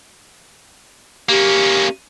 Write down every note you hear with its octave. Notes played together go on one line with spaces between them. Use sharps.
A#3 C#4 G4